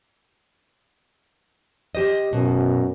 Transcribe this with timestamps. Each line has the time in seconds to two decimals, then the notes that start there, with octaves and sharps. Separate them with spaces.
1.95 G4 C5 D#5
2.33 F#2 B2